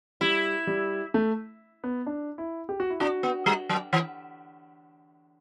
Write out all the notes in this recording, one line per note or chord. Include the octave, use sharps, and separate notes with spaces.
G3 E4
G3
A3
B3
D4
E4
G4
F#4
E4
D4 F#4
B3
G3
F#3
E3